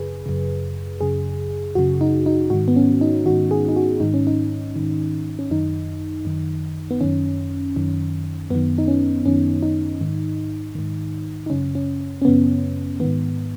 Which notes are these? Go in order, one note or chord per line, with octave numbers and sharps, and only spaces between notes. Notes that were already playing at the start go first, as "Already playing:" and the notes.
Already playing: F#2 C#3 G#4 B4
F#2 C#3
F#2 C#3 G#4
F#2 C#3 F#4
D#4
D#4
G#2 D#3 F#4
B3
C#4
D#4
G#2 D#3 F#4
G#4
D#4
F#4
G#2 D#3 D#4
C#4
D#4
G#2 D#3
C#4
F#2 D#3 D#4
F#2 D#3
B3
F#2 D#3 C#4
F#2 D#3
F#2 D#3 B3
D#4
C#4
F#2 D#3 C#4
D#4
G#2 D#3
G#2 D#3
D#4
F#2 C#3 C#4
C#4
C#4
F#2 C#3 B3
G#2 D#3 B3